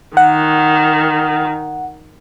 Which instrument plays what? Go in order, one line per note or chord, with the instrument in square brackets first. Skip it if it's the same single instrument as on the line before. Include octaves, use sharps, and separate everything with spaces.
[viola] D#3 [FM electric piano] F#5